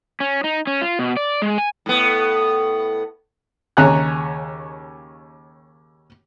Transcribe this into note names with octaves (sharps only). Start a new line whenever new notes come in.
C#4
D#4
C#4
F4
B2
D5
G#3
G#5
A2 B3
D#2 C#3 C#5 G#5 A#5 F#6